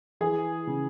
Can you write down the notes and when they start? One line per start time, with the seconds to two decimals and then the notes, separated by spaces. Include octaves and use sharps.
0.21 E3 G#4
0.67 C#3